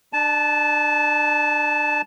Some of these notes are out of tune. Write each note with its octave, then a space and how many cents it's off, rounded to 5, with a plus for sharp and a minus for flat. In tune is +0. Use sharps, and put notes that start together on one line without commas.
D4 +30 A5 -15